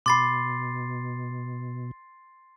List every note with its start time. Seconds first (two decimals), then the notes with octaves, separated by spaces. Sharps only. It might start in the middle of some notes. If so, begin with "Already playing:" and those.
0.06 B2 B5 C6 D6 A6 C7